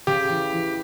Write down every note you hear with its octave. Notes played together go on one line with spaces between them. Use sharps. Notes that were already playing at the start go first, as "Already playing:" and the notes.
C#3 G4
E3
E3